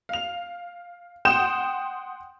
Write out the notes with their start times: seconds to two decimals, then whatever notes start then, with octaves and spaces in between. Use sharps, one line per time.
0.09 F5 F7
1.25 F#5 G5 C6 D#6 G6 E7